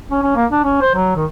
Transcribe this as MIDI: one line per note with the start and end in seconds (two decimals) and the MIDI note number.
0.11 0.20 61
0.23 0.35 61
0.36 0.46 58
0.51 0.64 62
0.64 0.77 61
0.81 0.92 72
0.95 1.13 54
1.16 1.25 51